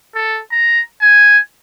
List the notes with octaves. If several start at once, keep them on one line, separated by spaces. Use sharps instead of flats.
A4
A#5
G#5